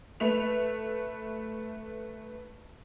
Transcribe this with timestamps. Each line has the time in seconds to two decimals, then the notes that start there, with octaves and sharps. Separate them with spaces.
0.20 A3 B4 F7